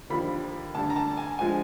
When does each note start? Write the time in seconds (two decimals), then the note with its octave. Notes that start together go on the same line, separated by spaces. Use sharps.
0.10 D#2 D3 F3 B5
0.75 D2 D3 G3 A5
0.90 A#5
0.96 A5
1.17 G#5
1.39 D3 F3 G#3 G#5